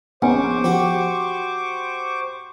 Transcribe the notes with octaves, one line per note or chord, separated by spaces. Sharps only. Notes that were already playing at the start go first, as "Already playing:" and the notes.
A#1 B3 C#4 D#4 C5 C#6 D6
F3 F#4 G4